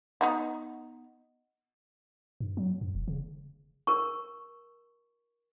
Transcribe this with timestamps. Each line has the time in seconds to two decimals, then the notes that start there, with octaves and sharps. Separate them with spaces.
0.21 B3 D#4 F#4
2.40 G2
2.57 F#3
2.81 F#2
2.95 E1
3.08 C#3
3.87 A#4 C#6